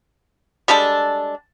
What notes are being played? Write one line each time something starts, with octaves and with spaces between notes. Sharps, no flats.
G3 G#3 D4 A4